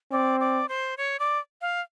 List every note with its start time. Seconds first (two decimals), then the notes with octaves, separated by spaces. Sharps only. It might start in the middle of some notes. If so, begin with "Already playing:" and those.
0.12 C4 D5
0.40 D5
0.69 C5
0.97 C#5
1.19 D5
1.61 F5